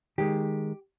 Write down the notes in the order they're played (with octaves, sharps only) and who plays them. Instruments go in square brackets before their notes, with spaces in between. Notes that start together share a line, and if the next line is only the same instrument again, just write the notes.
[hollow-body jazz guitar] D#3 G#3 G4